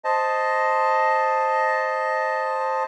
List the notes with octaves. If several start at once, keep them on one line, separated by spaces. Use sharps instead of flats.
C5 D#5 A5